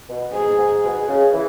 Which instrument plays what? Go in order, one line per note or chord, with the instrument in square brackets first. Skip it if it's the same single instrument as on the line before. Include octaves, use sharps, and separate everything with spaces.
[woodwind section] B2
[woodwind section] G#2 [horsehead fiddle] G#4
[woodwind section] G#2
[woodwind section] B2 [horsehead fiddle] G#4
[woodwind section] C#3
E3